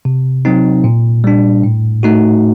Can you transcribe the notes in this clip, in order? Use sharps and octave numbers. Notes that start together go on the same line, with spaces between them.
C3
F#3 C4 D#4
A#2
G3 D4
A2
A3 D#4 F#4